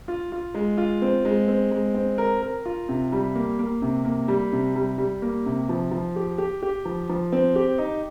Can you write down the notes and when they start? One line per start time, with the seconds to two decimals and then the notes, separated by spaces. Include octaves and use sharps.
0.08 F4
0.32 F4
0.54 G#3
0.78 F4
1.02 C4
1.25 G#3
1.48 C4
1.71 G#3
1.94 C4
2.18 A#4
2.42 A#4
2.65 F4
2.89 C3
3.12 G3
3.35 A#3
3.59 A#3
3.82 C3
4.05 A#3
4.28 G3
4.52 C3
4.76 G3
4.98 G3
5.22 A#3
5.46 C3
5.69 F3
5.91 F3
6.16 G4
6.38 G4
6.63 G4
6.85 F3
7.09 F3
7.32 C4
7.56 G4
7.78 D#4